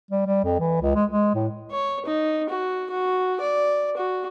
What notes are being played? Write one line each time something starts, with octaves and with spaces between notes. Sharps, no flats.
G3
G3
F2
E3
C#2
G#3
G#3
A2
C#5
D#4
F#4
F#4
D5
F#4